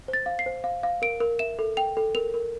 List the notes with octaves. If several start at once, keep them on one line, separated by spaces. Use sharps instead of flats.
C5
A6
F5
C7
C5
F5
F5
A#4 D7
A#4
E5 E7
A4
G5 F7
A4
A#4 F7
A#4